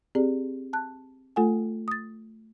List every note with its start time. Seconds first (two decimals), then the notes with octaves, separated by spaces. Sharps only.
0.15 C4 G4 G#4 D5
0.73 A5 F#6
1.36 A3 F4 A4 F#5 G#5
1.88 D#6 A6